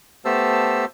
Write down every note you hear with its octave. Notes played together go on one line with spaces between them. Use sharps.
A3 B3 G4 C5 A5 E6